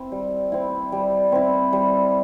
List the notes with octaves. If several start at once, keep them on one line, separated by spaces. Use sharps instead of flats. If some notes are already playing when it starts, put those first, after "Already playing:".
Already playing: C4 E4
G3
C4 E4
G3
C4 E4
G3